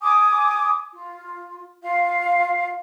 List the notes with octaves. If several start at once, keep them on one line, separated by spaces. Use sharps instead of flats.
G#5 D6 D#6
F4
F4 F5